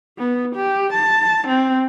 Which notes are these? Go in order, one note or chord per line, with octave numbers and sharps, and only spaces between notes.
B3
G4
A5
C4